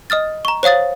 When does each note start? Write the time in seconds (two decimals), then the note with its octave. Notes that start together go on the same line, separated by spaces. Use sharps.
0.10 D#5 D#6 F6 A6
0.45 A#5 C#6
0.63 C5 C#5 F5 D#6 A6